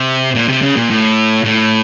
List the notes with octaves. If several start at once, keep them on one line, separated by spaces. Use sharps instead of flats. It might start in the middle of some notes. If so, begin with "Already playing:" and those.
Already playing: C3
A#2
C3
C#3
A#2
A2
A2